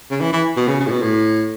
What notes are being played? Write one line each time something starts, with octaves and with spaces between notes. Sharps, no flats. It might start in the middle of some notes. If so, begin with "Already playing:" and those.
C#3
E3
E3
B2
C#3
C#3
A2
B2
A2